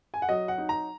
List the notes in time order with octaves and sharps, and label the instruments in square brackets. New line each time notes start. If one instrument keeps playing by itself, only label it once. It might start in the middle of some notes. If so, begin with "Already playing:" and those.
[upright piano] G#5
F#5
F#3 D#5
F#5
D#4
A#5